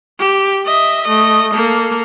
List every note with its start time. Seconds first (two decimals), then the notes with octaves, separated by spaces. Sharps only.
0.19 G4
0.65 D#5 E5
1.04 A3 D#5
1.53 A#3 A4